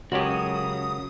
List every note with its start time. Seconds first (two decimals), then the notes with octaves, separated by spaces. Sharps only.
0.12 C#2 C#3 F#3 F#4 G4 A#4 C#5 D#6